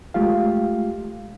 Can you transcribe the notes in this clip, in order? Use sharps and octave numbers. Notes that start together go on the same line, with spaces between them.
G#3 A3 F4 G4 F5